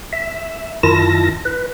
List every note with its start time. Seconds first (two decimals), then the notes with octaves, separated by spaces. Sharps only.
0.13 E5
0.83 F#2 D#3 E4 F4 A5 A#6
1.45 B4